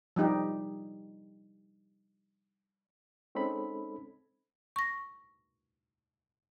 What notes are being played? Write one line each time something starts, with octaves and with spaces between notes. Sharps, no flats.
F3 G3 D#4 G4
G#3 C4 C#4 D#4 A4 B5
C#6 A#6